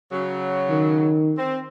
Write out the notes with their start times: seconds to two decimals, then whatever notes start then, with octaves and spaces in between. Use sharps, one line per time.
0.12 C#3 F#3
0.71 D#3
1.38 C4